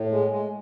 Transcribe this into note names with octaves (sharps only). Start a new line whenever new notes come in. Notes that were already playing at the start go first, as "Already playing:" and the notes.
Already playing: A2
G#3
G#3